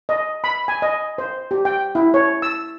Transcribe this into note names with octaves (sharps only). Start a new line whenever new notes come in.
D#5
B5
G#5
D#5
C5
G4
G5
E4
C#5
E6